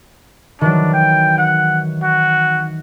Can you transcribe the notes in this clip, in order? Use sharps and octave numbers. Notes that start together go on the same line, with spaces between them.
D#3 E3 F#3 D4
G5
F#5
F#4